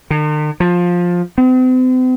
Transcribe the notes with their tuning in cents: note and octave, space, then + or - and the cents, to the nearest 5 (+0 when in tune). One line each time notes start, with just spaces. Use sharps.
D#3 -45
F3 +15
C4 -45